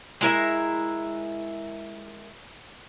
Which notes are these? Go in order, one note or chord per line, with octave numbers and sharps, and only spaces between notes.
G#3 E4 A#4 E5